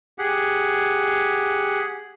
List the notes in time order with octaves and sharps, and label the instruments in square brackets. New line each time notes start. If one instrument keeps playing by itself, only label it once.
[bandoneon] G4 G#4 F#5